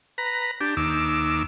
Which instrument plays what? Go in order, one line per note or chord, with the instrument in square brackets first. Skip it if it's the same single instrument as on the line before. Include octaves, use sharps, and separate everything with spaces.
[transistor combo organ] B4 A#5
D4 G4
D#2 D6 E6